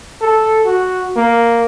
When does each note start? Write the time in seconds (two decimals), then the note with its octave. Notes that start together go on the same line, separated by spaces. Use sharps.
0.21 A4
0.66 F#4
1.16 A#3